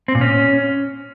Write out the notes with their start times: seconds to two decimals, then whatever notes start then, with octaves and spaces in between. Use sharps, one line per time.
0.08 C4
0.15 A#2
0.21 C#4